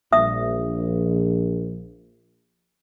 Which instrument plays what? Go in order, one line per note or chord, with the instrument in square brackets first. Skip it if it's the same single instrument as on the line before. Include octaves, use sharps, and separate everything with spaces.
[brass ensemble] A#1 [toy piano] E5 D#6